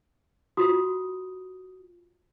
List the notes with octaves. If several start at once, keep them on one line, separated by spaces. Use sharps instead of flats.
F4 F#4 D#6